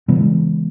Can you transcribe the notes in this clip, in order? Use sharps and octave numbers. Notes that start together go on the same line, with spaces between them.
C#3 E3 G#3 B3